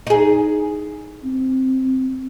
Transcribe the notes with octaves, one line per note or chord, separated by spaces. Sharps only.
D#4 G#4
C4